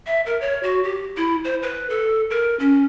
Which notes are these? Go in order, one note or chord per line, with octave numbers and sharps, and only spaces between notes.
E5
A#4
C#5
F#4
G4
E4
C5
B4
A4
A#4
C#4